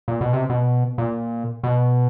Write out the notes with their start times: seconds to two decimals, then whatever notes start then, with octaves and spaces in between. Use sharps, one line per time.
0.08 A#2
0.21 B2
0.33 C3
0.50 B2
0.98 A#2
1.63 B2